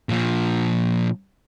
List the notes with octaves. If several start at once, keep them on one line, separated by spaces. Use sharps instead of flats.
A#2 F3